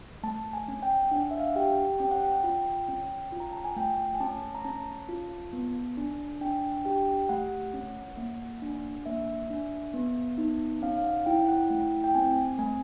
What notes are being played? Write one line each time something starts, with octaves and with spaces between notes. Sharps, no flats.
A3 A5
G#5
C#4
G5
D4 F#5
E5
F5
F#5
G4 G5
C#4 G5
F#5
G5
F4
C#4
F4
A#5
A5
G#5
A3 G5
G#5
C#4 A5
A#5
C#4 A5
F4
B3
D4
D4 G5
G4 G5
A3 F#5
C#4
A#3
D4
A#3 E5
D4
B3
D#4
C#4 F5
F5
F#5
E4 G5
F#5
A3 G5
G5
C4 G#5
A3 G#5